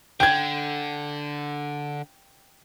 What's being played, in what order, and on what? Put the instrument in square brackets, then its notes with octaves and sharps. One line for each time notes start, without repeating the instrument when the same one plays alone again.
[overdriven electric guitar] D3 [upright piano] G5 G#6